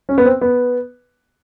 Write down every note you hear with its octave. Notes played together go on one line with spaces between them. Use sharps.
C#4
B3
C4
B3